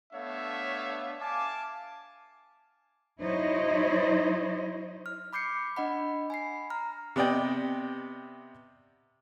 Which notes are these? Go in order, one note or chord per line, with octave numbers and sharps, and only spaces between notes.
A3 B3 D4 C#5 E5 F5
F5 G#5 A5 D6
F#3 D#4 E4 C5 C#5 D#5
F6
B5 D6 G6 C7 C#7
D4 D#5 F#5 B5
G#5 B5 C7
A#5 F6
C3 B3 D5 D#5 G5